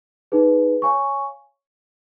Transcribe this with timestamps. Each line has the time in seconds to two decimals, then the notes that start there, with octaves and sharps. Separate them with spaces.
0.32 D#4 G#4 B4
0.82 C#5 F5 G#5 C#6